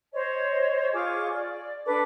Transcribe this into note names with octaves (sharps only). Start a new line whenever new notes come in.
C5 C#5 D#5
F4 G#4 C#6 D6
D5
D4 A4 B4 D6